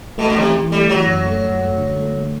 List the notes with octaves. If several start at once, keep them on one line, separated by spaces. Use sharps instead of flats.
B2 A3
D3
C3 E3
E3
G3 A3
E3 F#3
F#2
A3
F#2
A3
D3
A3
A3